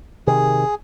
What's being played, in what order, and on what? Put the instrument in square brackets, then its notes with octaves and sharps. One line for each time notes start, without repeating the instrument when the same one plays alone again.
[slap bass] C3 D#3 [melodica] G#4